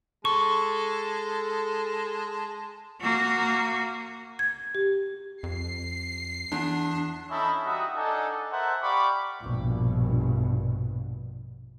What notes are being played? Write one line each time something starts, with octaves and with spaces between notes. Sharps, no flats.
G#3 A4 A5 C#6
A#3 F#4
G#6
G4
F2 C7
E2 D4
C#4 D#4 E4 A4 D#5 B5
G3 D#4 F#4 E5 D#6
D4 D#4 A4 D#5 F#5 G#5
A#4 C5 E5 F#5 A5
G4 D5 F5 B5 C#6 D6
A#1 G2 B2